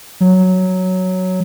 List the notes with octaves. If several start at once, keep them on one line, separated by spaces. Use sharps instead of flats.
F#3